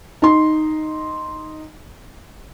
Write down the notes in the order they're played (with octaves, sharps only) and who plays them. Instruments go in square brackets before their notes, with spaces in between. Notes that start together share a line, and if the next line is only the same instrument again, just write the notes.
[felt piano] D#4 C6